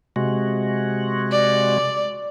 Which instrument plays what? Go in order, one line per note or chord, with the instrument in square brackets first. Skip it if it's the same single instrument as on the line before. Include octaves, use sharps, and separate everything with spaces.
[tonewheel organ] C3 G#3 F#4
[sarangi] D5